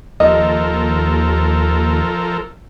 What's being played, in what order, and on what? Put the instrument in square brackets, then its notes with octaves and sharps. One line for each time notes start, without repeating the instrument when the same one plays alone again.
[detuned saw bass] D#2 [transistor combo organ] F3 A4 A#4 [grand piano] D#5